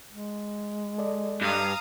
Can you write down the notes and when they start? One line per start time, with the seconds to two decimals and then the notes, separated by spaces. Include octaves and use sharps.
0.12 G#3
0.98 A4 D5 D#5
1.42 G2 F5 A#5 D#6